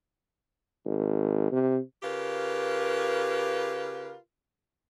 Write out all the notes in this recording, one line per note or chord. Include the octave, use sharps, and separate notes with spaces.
G#1
C3
C#3 F4 G4 A#4 B4